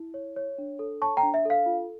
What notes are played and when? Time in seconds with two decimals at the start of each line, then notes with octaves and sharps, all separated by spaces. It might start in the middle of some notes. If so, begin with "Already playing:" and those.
Already playing: E4
0.14 C#5
0.36 C#5
0.58 D4
0.79 A4
1.01 C#5 A5 C#6
1.17 G5 A#5
1.23 D4
1.34 E5
1.45 A4 F5
1.66 F4